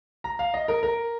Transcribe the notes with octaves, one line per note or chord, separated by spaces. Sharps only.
A#5
F5
D#5
A#4
A#4